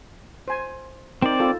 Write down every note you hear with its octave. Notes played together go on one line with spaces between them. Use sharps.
C5 G#5
C4 D#4 A#4 D5 G5
F4 A4